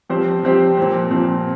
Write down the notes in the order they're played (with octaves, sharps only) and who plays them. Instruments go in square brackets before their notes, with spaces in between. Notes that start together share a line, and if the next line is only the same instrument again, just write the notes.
[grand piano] F3 C4 G4 C5
F3 C4 G4 C5
A#2 F3 C4
A#2 F3 C4